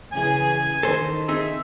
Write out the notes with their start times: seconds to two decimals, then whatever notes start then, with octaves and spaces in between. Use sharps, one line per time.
0.12 C#3 E3 G#4 G#5
0.83 D#3 A4 C5
1.29 C4 D#4 G#4 E5